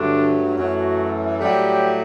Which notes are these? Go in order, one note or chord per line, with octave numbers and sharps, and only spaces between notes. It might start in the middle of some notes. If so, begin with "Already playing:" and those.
Already playing: G2 D3 F#3 A3 D4
F#2 E3 F#3 A3 F#4
A2 F#3 G3 A3 G4